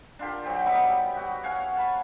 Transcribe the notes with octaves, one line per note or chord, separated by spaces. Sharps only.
D4 F4 G4 A#4
F#3 G4 C5
G3 B3 D#4 E5
F#4 G4
C#5 F5 F#5 G#5
A5 B5 C#6